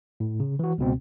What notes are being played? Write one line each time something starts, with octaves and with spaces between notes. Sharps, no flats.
A2
C#3
E3 F#4
C#2 B2 C4